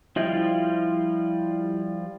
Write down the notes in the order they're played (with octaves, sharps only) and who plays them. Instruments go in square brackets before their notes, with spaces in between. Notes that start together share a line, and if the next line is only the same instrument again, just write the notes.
[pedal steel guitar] F3 G3 F4 [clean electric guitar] E4 D#5 G5